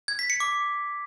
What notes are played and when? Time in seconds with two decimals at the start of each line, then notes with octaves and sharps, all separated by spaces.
0.08 G#6
0.19 B6
0.30 C#7
0.40 D6